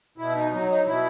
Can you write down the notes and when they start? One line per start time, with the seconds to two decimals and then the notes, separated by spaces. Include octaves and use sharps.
0.18 B2 E4
0.35 D#4
0.52 F#3 D#4
0.68 D#4
0.86 B2 E4